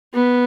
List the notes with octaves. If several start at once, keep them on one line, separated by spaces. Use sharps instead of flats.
B3